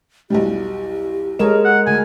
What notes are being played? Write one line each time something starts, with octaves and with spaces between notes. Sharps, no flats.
B1 E2 G3 G4
G#3 A4 A#4 C#5 D#5 E7
F#5
D2 G#5